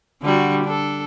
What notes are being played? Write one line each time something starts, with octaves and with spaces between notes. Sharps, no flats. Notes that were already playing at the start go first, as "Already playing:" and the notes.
D3 G3 F#4
D4 A4